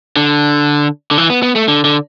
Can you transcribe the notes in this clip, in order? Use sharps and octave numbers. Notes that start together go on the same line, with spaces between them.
D3
D3
E3
B3
B3
A3
D3
D3